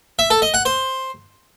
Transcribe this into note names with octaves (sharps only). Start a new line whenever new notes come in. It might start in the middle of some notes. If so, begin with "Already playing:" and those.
E5
A4
D#5
F#5
C5